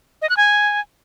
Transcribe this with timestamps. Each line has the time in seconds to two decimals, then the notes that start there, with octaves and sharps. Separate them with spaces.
0.22 D#5
0.29 F#6
0.37 G#5